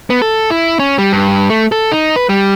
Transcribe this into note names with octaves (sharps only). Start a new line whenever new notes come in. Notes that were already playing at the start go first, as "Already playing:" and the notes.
B3
A4
E4
C#4
G3
G2
A3
A4
D#4
B4
G3